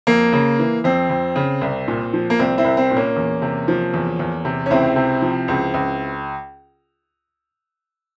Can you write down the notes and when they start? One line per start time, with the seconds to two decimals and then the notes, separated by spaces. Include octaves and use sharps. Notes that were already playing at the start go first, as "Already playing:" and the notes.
0.07 F2 A#3
0.33 C#3
0.59 E3
0.84 F2 C4
1.10 F2
1.36 C#3
1.61 C2
1.88 A#2
2.13 F3
2.30 A#3
2.39 C2 C4
2.58 C4 E4
2.65 C2
2.77 C4
2.91 A#2
2.97 A#3 C#4
3.16 E2
3.42 C3
3.68 F3
3.94 E2
4.19 E2
4.45 C3
4.66 C#4
4.70 C#2 C4 E4
4.96 C3
5.22 F3
5.48 C#2
5.74 C#2